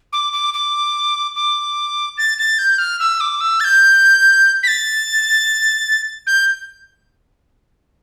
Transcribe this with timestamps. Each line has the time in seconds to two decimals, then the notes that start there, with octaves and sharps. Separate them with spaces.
0.13 D6
0.33 D6
0.54 D6
1.35 D6
2.18 A6
2.38 A6
2.59 G6
2.78 F6
2.99 E6
3.21 D6
3.41 E6
3.60 A6
3.64 G6
4.63 B6
4.68 A6
6.27 G6